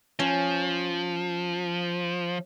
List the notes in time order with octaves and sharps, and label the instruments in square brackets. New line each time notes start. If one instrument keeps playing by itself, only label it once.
[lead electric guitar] F3 [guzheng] C#4